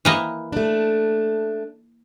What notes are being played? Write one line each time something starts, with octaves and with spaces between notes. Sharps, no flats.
E3 A#3 D#5
A3 D4